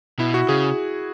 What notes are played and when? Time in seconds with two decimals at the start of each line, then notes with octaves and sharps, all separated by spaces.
0.19 B2 E4
0.34 F#4
0.49 C#3 G#4